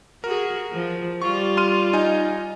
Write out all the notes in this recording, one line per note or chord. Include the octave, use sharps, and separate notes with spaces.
F#4 G#4 A#4
F3
G3 F4 C#6
C6 F6 D#7
D#4 D#5 G#5